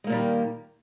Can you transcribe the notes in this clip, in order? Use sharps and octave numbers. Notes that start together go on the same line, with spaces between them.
A#2 D#3 G3 G#3 A#3